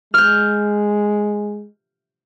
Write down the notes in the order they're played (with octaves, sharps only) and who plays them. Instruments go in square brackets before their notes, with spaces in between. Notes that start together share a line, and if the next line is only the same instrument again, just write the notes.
[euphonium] G#3 [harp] F6 G6